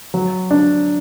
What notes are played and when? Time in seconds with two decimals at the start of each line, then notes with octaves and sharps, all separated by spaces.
0.14 F#3
0.51 D4